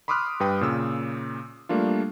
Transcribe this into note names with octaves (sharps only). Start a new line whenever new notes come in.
B5 C6 D6 D#6 F6 F#6
G2 B4 G5 D#6
A#2 C#3 E6
G3 A3 A#3 D4 F4